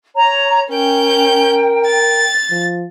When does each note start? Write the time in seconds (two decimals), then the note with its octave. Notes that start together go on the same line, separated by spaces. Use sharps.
0.16 C#5 A#5
0.71 C#4 A#4 G5 G6
1.86 A6
2.50 F3